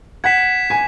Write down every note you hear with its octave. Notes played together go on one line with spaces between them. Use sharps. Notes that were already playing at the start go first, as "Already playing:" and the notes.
F#5 G#6 B6 E7
G#5